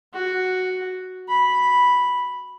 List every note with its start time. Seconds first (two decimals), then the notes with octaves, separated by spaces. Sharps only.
0.14 F#4
1.29 B5